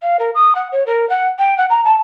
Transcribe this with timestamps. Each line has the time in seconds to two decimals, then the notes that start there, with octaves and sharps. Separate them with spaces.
0.01 F5
0.19 A#4
0.34 D#6
0.55 F#5
0.72 C#5
0.86 A#4
1.09 F#5
1.38 G5
1.57 F#5
1.69 A#5
1.84 A5